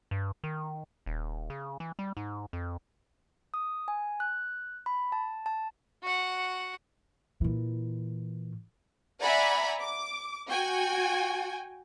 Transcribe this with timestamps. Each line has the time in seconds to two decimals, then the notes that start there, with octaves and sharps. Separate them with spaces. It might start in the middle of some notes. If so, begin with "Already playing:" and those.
0.11 G2
0.44 D#3
1.06 D#1
1.50 C#3
1.80 E3
1.99 G3
2.17 G#2
2.53 F2
3.54 D#6
3.88 G#5
4.20 F#6
4.86 B5
5.12 A5
5.46 A5
6.03 F#4 F#5
7.41 A#2 E3
9.20 D5 E5 F#5 G#5 A#5 B5
9.81 D6
10.48 F#4 G5 G#5